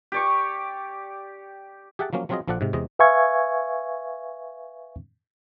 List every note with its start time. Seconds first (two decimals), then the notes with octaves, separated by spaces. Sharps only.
0.12 G4 D5 C#6
1.99 G4 G#4 E5 F#5 G5 A5
2.13 F3 F#3 A#3 C#4
2.29 F3 F#3 C4 F4 G#4 D#5
2.48 A#1 F3 A4 D5 F#5
2.61 G#2 C3
2.73 E2 C3 G#3 D#5
2.99 B4 E5 F5 G#5 C#6 G#6